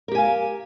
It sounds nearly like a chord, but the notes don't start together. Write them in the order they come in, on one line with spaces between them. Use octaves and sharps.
A#4 G4 G#5 F5